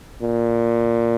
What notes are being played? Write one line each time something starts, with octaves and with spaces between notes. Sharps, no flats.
A#2